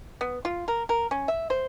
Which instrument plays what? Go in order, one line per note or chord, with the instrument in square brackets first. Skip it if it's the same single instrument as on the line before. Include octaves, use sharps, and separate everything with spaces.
[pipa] B3
F4
A#4
A#4
C#4
E5
C5